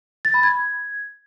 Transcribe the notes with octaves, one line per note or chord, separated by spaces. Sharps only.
A6
B5
G#6